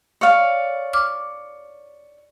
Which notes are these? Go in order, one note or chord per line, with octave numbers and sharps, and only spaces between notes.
C#5 D5 F5
D6 F6